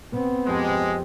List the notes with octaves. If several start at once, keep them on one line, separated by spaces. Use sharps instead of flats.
B3 C4
F2 G#3 G4 A5